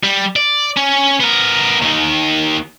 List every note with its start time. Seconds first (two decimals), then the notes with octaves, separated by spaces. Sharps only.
0.04 G3
0.36 D5
0.77 C#4
1.20 B3 A#4
1.82 D#2 D#3